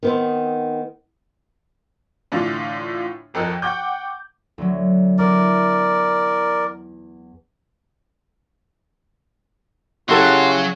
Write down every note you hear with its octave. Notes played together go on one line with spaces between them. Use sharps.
D#3 B3 C4
A2 D3 E3 D4 F4
G#1 F2 A4 A#4 D#5 F#6
F#5 G5 C#6 D6 G6
D2 F#3
E2 A#4 D5
C#3 F#3 E4 F#4 G4 A4 C6